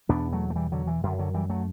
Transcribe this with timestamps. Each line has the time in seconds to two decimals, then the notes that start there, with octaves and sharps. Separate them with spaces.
0.09 E2 B2 B3 D4
0.32 F#3 A3
0.50 A3
0.56 E3 G3
0.72 D3 F#3
0.87 E3
1.03 F#2 D3
1.19 D3 F#3
1.34 E3 G3
1.50 F#3 A3